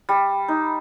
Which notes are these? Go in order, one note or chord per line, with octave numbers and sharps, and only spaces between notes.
G3
D#4